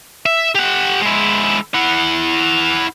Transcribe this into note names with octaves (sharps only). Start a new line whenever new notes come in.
E5
G4 F#5
G#3 E4
E4 F#5